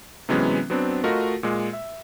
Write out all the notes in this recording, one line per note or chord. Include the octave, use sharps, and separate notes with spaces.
C3 E3 F#3 G#3 B3 C#4
F#3 B3 C4 D4
A3 F4 F#4 A#4 D#5
A#2 G#3
E5